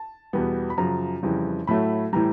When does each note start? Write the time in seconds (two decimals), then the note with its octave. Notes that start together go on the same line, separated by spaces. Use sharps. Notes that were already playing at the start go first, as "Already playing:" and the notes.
Already playing: A5
0.33 E2 B2 G3 B3
0.70 B5
0.78 F#2 C#3 F3 A#5
1.23 F2 C#3 E3 G3
1.67 A2 F#3 A3 B5
2.13 A2 E3 G3 A#5